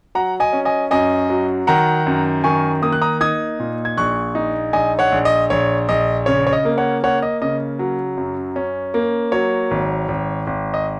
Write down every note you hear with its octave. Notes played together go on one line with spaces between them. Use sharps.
F#3 F#5 A#5
D#5 G#5
C#4
D#5 G#5
F#2 D#5 G#5
F#3
D#3 F#5 A#5
F#2
D#3 G#5 C#6
A#3 D#6
F#6
A#5 D#6
D#4 D#6 G#6
A#2
G#6
A#1 C#6 F#6
D#4
A#1 D#5 G#5
C#5 F#5
A#1
D#5
A#1 C#5
A#1 D#5
C#3 C#5
C#5
D#5
A#3
C#5 F#5
A#3 C#5 F#5
D#5
C#3 D#5
F#3
F#2
C#4
A#3
F#3 C#5
G#1
G#1
G#1
D#5